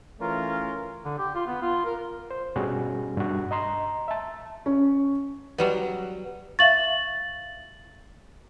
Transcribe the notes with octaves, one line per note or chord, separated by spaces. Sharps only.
E3 A3 C#4 F4 A#4
D3
G4
F4
B3
F4
A#4
C5
G2 B2 G3 C#4 F#4 G#4
G2 F#4
D#5 A#5 C6
E5 A5
C#4
F#3 G3 B3
E5 F5 C#6 A6 F#7